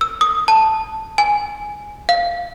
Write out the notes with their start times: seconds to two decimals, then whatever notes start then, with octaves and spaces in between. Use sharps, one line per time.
0.01 E6
0.21 D#6
0.48 A5
1.18 G#5
2.09 F5